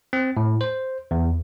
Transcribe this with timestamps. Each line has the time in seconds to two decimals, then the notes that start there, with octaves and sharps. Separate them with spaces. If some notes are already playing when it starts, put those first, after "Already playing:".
0.13 C4
0.37 A2
0.61 C5
1.11 E2